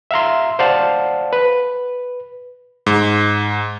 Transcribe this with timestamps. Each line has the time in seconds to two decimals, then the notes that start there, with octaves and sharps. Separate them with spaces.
0.11 E5 F5 A#5 C6
0.59 C5 D5 F5 F#5 A5
1.33 B4
2.86 G#2